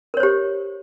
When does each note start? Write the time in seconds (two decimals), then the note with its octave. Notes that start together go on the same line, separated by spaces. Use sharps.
0.14 A#4
0.17 C#5
0.20 C5
0.23 G4